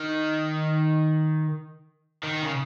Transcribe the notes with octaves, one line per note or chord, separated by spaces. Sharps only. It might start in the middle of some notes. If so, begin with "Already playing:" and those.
Already playing: D#3
D#3
C#3